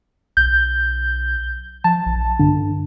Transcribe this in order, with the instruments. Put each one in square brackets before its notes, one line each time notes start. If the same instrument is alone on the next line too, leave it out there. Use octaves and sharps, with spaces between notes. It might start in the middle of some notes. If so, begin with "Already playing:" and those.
[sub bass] B1 [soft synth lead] G6
[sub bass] F3 [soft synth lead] A5
[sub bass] A#1
[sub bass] G2 [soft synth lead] D3